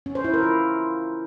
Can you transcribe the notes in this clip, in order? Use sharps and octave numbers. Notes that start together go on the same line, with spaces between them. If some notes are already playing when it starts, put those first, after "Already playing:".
C#4
C5
E4
A#4
F4